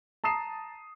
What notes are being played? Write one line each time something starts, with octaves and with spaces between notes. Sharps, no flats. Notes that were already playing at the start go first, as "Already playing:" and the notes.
A5 A#5 D#6 C7 E7